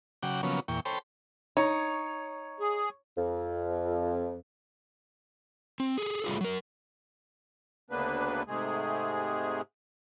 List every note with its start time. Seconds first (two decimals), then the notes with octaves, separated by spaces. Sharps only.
0.23 C#3 F#3 F#5 G5 D6
0.43 C#3 F3 F#3 A#3 B3 C#4
0.68 E2 A#2 G5 C#6
0.85 A4 C5 C#5 G5 B5 C6
1.57 D#4 C#5
2.60 G#4
3.18 F2
5.80 C4
5.98 G#4 A4
6.25 G3 A3 F4 G#4
6.41 F#3 A#4
7.90 D2 C#3 A#3 B3 D4 B4
8.48 G#2 C3 G#3 A3 G#4